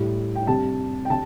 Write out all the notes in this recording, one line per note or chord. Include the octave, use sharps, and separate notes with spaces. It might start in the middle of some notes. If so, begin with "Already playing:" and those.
Already playing: A2 G3
G5
C3 G3 A5
G5
C3 A5